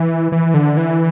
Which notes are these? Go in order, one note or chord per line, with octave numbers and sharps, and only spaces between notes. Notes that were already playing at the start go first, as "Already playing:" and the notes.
Already playing: E3
E3
D3
E3